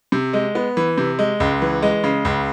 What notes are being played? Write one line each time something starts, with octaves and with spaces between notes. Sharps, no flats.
C3
G#3
B3
E3
C3
G#3
C#2
E3
G#3
C#3
C#2